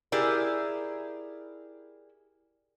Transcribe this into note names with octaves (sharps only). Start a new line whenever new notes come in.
E4 G4 G#4 A#4 D5